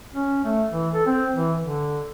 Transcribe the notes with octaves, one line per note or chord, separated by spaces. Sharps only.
C#4
A3
E3
A4
C4
E3
D3